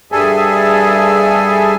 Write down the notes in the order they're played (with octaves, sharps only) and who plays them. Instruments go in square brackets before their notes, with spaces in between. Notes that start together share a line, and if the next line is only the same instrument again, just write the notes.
[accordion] G2 G3 G#4 A4 E5 G#5